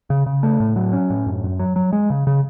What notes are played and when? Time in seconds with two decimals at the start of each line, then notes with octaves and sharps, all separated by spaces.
0.10 C#3
0.26 C#3
0.43 A3
0.60 A2
0.76 F#3
0.93 C#4
1.10 A2
1.26 F#2
1.44 F#2
1.59 F#3
1.76 F#3
1.93 G#3
2.10 C#3
2.27 C#3